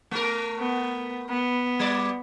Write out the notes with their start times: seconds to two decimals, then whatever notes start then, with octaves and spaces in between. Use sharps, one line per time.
0.11 A3 A#4
0.59 B3
1.29 B3
1.79 G3 D5